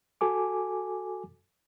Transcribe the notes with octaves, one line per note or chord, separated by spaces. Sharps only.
F#4 A4 G#5 D6